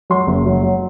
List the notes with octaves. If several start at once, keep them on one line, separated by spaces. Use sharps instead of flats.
F#3 C6
F#1
F#3
F#3